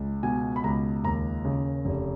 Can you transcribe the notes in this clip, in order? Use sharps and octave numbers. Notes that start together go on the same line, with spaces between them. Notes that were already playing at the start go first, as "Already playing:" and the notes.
Already playing: C#2
B2 G#5
B5
C#2 A#5
D#2 A#5
C#3
F1